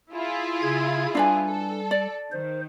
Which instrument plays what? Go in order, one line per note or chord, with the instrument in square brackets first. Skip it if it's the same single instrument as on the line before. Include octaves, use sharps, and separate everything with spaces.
[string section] E4 F4 G#4
[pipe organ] C#3 G#6
[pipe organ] G3 [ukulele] D4 B4 G#5
[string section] A4
[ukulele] D5
[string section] D#3 [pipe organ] C5